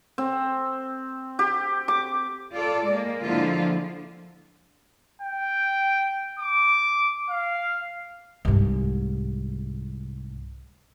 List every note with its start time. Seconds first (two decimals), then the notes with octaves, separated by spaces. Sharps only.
0.18 C4
1.39 G4
1.88 D6
2.53 F4 A4 D5
2.87 G#3 A#3
3.24 D3 F3 G#3 A#3 E4 F4
5.22 G5
6.40 D6
7.30 F5
8.45 C2 G#2